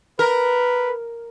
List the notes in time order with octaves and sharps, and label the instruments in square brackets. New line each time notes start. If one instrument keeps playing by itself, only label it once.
[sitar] A#4 [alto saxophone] B4